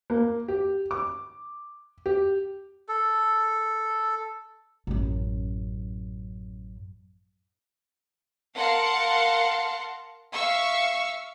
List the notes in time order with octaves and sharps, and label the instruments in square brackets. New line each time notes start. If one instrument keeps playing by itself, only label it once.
[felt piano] A#3
G4
D6
G4
[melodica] A4
[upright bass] A1 F#2
[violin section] A#4 F5 F#5 A5 C6
E5 F5 C#6 E6